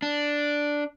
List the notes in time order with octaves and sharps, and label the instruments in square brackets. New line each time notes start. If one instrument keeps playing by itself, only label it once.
[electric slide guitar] D4